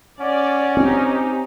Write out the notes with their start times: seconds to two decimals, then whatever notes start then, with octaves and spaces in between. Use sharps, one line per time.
0.20 C#4 D5 F#5
0.77 C4 D#4 G4 G#5